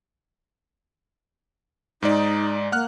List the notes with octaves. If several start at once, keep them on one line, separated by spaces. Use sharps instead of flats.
G#2 G#3 D#4 D5
A#3 F#5 F6 F#6